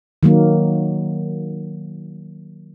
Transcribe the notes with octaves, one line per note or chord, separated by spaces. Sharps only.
D#3 F#3 A#3